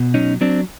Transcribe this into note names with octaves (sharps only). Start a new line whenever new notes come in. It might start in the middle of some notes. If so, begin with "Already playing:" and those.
Already playing: B2
F#3 C#4 D#4
F#3 C4 D4